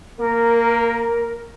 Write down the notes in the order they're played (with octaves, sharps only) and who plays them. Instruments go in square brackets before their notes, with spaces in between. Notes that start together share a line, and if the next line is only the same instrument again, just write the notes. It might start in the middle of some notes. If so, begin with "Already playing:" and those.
[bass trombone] A#3 [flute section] A#4